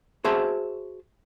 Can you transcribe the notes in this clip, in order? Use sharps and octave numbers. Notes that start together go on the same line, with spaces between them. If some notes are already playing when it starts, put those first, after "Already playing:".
F#4 G#4 C5 E5 A5